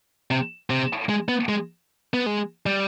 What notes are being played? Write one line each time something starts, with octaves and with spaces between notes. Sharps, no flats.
C3
C3
G#3
B3
G#3
B3
G#3
G3